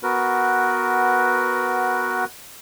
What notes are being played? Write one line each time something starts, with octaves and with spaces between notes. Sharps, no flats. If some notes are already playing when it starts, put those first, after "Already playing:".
B3 F#4 A#4 B4